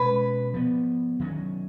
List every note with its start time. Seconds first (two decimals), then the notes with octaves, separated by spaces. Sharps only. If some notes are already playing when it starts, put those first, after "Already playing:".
Already playing: B2 G#3 C#4 B4
0.54 F3 B3
1.20 D#3 F#3 C#4